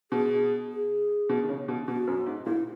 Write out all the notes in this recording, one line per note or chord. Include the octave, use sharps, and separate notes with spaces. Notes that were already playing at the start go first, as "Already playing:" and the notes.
B2 G#4
G#4
B2
D#3
C#3
B2
B2 F#4
F#2
G#2
A#2 E4